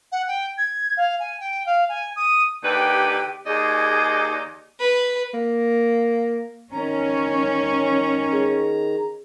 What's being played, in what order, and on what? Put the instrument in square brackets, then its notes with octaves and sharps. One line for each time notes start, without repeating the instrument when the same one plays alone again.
[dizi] F#5
G5
G#6
F5
G#5
G5
F5
G#5
D#6
[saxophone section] D#2 D3 B4 [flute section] G4 G5
[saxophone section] D#2 D5 D#5 [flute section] G#4
[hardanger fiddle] B4
[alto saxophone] A#3
[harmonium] D#3 A#5 [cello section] C#4
[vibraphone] G#4